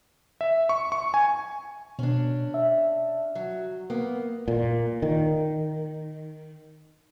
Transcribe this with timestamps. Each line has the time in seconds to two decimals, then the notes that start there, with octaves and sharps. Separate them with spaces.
0.41 E5
0.69 C#6
0.92 C#6
1.14 G#5
1.99 B2 C#4 D4
2.54 E5
3.35 F#3
3.90 A#3 B3
4.48 A#2
5.02 D#3